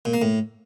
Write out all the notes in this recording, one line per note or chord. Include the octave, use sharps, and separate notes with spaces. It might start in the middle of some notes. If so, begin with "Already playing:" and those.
A#2
A#3
A2